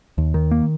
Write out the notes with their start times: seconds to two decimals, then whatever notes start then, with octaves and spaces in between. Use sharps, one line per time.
0.18 D#2
0.34 D#3
0.51 A#3